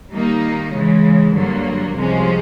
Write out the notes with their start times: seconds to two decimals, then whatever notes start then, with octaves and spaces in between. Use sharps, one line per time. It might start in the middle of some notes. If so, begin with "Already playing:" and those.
0.11 D#3 G3 A#3 D#4
0.73 C#3 E3 G#3
1.33 G2 D3 F#3 A#3
1.94 C2 C3 F3 G#3 C#4